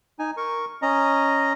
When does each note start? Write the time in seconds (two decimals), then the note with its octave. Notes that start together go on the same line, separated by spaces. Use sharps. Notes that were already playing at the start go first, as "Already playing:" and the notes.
0.19 D#4 G#5
0.37 A#4 C#6
0.82 C#4 D#5 A#5